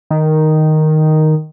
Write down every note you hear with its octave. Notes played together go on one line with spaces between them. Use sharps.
D#3